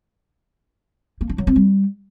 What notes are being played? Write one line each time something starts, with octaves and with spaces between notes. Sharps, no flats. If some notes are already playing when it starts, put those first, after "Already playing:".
A#3
D4
F#3
C4
G3